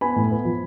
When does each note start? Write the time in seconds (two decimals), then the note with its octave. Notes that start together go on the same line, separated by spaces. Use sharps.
0.01 B3 G#5 B5
0.16 A2
0.31 B3
0.45 F3